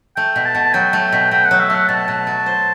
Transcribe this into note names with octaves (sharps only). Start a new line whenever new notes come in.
A3 G5
B2
A5
B2
F#3 G5
A3
B2
B2 G5
F#5
F#3
E5
A3 F#5
B2 A5
B2
F#3
C5